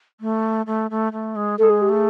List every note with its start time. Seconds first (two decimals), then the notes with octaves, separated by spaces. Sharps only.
0.21 A3
0.67 A3
0.91 A3
1.13 A3
1.36 G#3
1.59 A3 A4
1.63 G#3
1.70 G#4
1.81 G4
1.89 A3 G#4